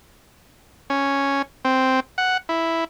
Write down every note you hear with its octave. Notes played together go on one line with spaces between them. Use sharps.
C#4
C4
F#5
E4